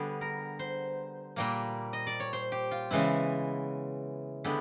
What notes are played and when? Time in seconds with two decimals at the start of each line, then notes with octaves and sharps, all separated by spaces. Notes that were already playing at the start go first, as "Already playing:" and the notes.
Already playing: D3 G3 B3 G#4
0.21 A#4
0.59 C5
1.36 A#2 G3 A#3
1.93 D#5
2.07 D5
2.20 C#5
2.33 C5
2.52 G4
2.71 F4
2.91 C#3 E3 G#3 B3 E4
4.44 D3 G#3 B3 E4 G4